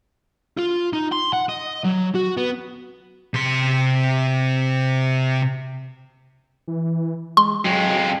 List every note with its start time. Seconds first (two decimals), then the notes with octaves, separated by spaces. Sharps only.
0.59 F4
0.93 D#4
1.12 C6
1.33 F#5
1.49 D#5
1.85 F#3
2.15 F#4
2.37 B3
3.34 C3 C6
6.68 E3
7.37 G#3 C6
7.65 F2 F#3 G#3